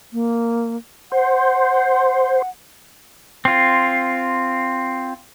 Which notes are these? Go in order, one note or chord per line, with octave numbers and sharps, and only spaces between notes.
A#3
C5 F#5
C4 F4